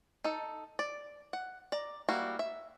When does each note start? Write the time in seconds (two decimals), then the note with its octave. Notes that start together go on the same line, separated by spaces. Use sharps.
0.24 D#4 A4
0.79 D5
1.33 F#5
1.72 D5 A#5
2.09 G3 A#3 E4 F#4
2.39 E5